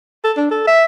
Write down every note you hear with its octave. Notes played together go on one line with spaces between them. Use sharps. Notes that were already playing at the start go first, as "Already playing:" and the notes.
A4
D4
A4
E5